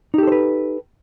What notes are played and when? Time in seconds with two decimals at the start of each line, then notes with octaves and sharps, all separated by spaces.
0.14 D#4
0.18 G4
0.23 A4
0.27 C5
0.32 B4